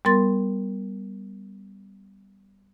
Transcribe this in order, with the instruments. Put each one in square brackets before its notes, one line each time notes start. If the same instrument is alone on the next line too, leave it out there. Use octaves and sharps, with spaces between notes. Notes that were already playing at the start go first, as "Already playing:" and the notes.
[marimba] G3 B3 A#4 C6 A6